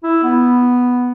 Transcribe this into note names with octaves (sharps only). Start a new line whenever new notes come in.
E4
B3